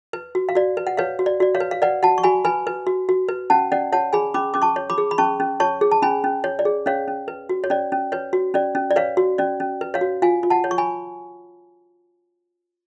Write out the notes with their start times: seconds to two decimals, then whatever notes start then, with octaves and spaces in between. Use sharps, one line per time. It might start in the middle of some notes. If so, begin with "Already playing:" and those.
0.13 B4
0.35 F#4
0.49 F5
0.55 F#4 D5
0.77 B4
0.87 F#5
0.97 B4 C#5 F5
1.19 F#4
1.26 D5
1.40 F#4 D5
1.55 C#5 F5
1.60 B4
1.71 F5
1.82 B4 D5 F#5
2.03 F#4 F#5 A5
2.18 C#6
2.23 F#4 G#5 B5
2.45 B4 G#5 B5
2.67 B4
2.87 F#4
3.09 F#4
3.29 B4
3.50 C#4 F#5 A5
3.72 C#4 D5 F#5
3.93 C#5 F#5 A5
4.13 G#4 G#5 B5
4.34 C#4 B5 D6
4.54 C#4 D6
4.62 A5 C#6
4.76 C#5
4.90 B5 D6
4.98 G#4
5.11 B5
5.18 C#4 A5 C#6
5.40 C#4
5.60 C#5 A5 C#6
5.81 G#4
5.91 A5
6.02 C#4 G#5 B5
6.24 C#4
6.44 C#5
6.59 D5
6.65 G#4
6.86 C#4 C#5 F5
7.08 C#4
7.28 B4
7.49 F#4
7.64 C#5
7.70 C#4 D5
7.92 C#4
8.12 B4 C#5
8.33 F#4
8.54 C#4 D5
8.75 C#4
8.91 D5
8.96 B4 C#5 F5
9.17 F#4
9.38 C#4 D5
9.60 C#4
9.81 B4
9.94 C#5 F5
10.01 F#4
10.22 F4 F5 G#5
10.43 F4
10.50 F#5 A5
10.64 C#5
10.71 C#6
10.78 G#5 B5